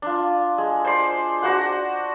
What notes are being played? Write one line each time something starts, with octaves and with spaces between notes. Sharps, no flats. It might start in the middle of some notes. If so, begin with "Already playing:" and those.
D4 F4
G#3
C5 D5 C6
D4 F#4 C5 F#5